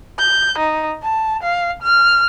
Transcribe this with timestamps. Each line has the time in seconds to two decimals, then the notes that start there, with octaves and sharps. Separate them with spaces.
0.18 G6
0.58 D#4
1.03 A5
1.43 F5
1.82 F6